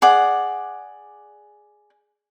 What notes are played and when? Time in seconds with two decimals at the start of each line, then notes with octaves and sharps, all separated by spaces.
0.02 G#4 D5 F#5